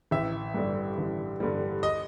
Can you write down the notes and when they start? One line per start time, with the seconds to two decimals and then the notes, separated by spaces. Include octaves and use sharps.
0.11 A1 E5
0.54 G2 D3 G3
0.98 A1
1.40 G2 D3 G3
1.83 D#5